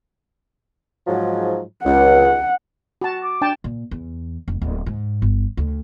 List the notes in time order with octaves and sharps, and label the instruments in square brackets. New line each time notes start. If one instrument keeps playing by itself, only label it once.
[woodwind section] G#2 F3 F#3
[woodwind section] C#2 [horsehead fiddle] F#5
[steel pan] F#4 A5
[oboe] D6
[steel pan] D4 G5 A5
[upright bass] A#2
E2
F1
D1
G#2
G1
D2